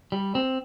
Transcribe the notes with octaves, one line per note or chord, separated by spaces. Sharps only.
G3
C4